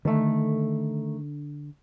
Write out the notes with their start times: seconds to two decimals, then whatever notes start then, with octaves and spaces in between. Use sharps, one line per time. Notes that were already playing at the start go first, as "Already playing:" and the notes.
0.05 D3 D#3 A3